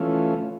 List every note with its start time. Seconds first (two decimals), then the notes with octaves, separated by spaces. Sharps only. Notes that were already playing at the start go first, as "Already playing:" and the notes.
Already playing: E3 A3 C#4 F4